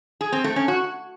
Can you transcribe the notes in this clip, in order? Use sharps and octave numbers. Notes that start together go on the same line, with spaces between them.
G#4
C4
A3
C#4
F#4